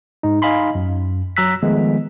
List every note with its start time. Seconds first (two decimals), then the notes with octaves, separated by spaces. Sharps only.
0.23 G#2 D#4
0.42 D#4 D#5 F5 G#5 B5 C6
0.75 F#2
1.37 F#3 A#5 E6 F#6 B6
1.63 D#3 F3 G#3 A3 B3